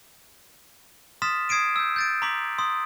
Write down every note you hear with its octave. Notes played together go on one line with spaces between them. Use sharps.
C6 D#6 F6 A6 B6 E7
D#6 G#6 C7 D7 D#7
E6 G6
G6 A6 D7
A#5 C6 D6 B6 F#7
C6 D#6